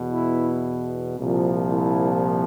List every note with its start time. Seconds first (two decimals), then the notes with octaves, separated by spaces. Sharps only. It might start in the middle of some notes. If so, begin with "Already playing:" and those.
Already playing: E2 B2
0.11 E4
1.18 C2 A#2 F3
1.72 E4